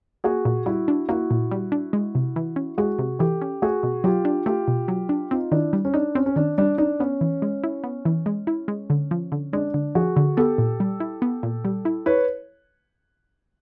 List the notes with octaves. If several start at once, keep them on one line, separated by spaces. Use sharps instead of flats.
A#3 F#4 G#4
A#2
G3 E4 F#4
D4
A#3 E4 F#4
A#2
G3
D4
G#3
C3
E3
C#4
G#3 F#4 G#4
C3
E3 G4 A4
C#4
A3 F#4 G#4
B2
F#3 F4 G4
D4
A3 F4 G4
B2
F#3
D4
C4 D#4 F4
D#3 D4 E4
G3
C#4
D4 D#4
C4 C#4
C#4
D#3 D4
G3 D4
D4 D#4
B3 C#4
E3
G#3
E4
B3
E3
G#3
E4
G#3
D3
F3
D3
G#3 D4
D3
F3 F#4 G#4
D3
B3 G4 A4
A#2
G3
E4
B3
A#2
G3
E4
E4 B4 C#5